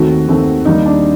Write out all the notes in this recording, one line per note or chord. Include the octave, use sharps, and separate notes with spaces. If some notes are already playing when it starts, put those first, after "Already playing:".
Already playing: D#2 D#3 A3 C4 F#4
D#2 D#3 A3 C4
D#2 D#3 G3 A#3 D#4
D4